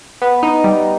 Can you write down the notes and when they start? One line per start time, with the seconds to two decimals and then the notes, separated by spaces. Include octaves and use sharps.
0.22 B3
0.43 D#4
0.64 G3